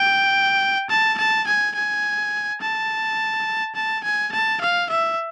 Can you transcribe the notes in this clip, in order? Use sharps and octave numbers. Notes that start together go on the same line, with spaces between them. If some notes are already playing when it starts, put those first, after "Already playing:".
Already playing: G5
A5
A5
G#5
G#5
A5
A5
G#5
A5
F5
E5